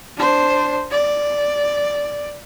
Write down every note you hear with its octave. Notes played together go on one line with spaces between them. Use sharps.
D4 C5
D5